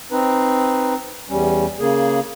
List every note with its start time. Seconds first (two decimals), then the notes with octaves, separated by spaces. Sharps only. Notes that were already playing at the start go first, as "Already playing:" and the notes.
0.12 C4 D#4 B4
1.29 E2 G3 C#4
1.80 C#3 A#3 G#4